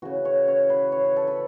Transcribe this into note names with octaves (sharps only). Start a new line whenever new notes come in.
C#3 E3 F#4
C#5
C#5
B4
C#5
B4
A4
B4